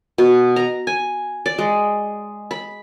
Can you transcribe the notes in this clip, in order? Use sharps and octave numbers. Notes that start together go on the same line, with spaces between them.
B2
A#5
G#5
D5
G#3
B5